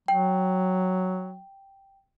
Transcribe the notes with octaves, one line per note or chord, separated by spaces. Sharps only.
F#3 G5